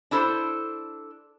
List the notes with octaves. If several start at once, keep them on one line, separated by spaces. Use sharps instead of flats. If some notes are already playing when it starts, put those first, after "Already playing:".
D4 E4 A4 A#4 C5 D5